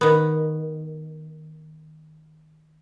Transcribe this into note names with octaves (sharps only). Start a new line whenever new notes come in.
D#3 B3